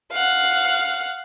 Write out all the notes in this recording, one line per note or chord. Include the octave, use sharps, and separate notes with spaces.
F5 F#5